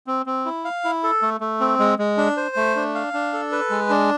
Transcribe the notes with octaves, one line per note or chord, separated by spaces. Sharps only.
C4
C4
E4
F5
E4
A4
A3
A3
C4
G#3
G#3
D4
C5
A3
D4
F5
D4
A4
B4
G#3
D4